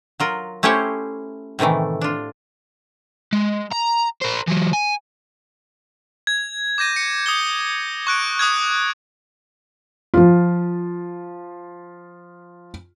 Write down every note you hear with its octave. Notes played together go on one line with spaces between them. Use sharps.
F#3 F4 A#4
A3 C#4 E4 G4 C5 C#5
A2 C3 D#3 E3 A3
D4 F4
G#3
A#5
A#4 C5
E3 F#3
G#5
G#6
D6 G6 A#6 D#7
C#7
D#6 G6 G7
C#6 F#6 D7
C#6 D#6 F#6 G#6
F3 F4